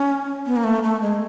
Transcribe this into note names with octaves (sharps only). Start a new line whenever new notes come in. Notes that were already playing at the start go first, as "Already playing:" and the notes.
Already playing: C#4
B3
A#3
A3
A3
G#3